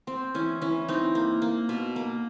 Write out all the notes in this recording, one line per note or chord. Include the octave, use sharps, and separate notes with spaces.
C4
E3 C#4
E3 C#4
C4 D#4
A#3
A#3
B2
A#3